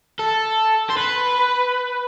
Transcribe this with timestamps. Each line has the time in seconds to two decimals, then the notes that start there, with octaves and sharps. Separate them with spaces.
0.19 A4
0.90 C5
0.97 B4